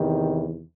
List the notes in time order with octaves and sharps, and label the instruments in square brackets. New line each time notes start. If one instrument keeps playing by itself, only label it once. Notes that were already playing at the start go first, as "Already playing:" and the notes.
Already playing: [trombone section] E2 C3 D#3